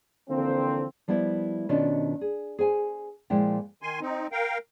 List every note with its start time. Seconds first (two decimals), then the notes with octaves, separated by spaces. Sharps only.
0.30 D3 E3 F3 A#3 C4
1.08 F3 G3 B3 E4 E5
1.69 B2 D#3 C#4 D4 F4 F#4
2.21 G#4
2.59 G#4 C5 G#5
3.30 A#2 F3 G#3 A#3 E4 G5
3.82 D#3 G#5 C6
4.01 C4 D#4
4.32 A#4 F5 G5